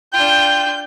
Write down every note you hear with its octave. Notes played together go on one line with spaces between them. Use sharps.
D4 F4 G5 G6